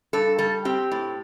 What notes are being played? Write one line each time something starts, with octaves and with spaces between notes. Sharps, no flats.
G2 A4
G3 A4
C4 G4
A2